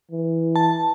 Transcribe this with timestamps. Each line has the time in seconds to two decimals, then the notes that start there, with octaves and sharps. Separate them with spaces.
0.11 E3
0.56 A5